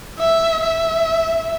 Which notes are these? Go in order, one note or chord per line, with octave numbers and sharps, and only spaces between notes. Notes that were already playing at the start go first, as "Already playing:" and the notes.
E5
E5